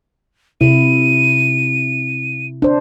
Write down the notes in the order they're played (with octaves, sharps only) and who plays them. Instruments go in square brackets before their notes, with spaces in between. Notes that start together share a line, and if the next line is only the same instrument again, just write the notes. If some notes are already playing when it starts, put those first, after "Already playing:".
[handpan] C3 E4 [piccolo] D#7
[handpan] D4 C5